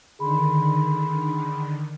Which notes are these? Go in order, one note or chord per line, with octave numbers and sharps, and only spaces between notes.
D3 D#3 G#4 B5 C6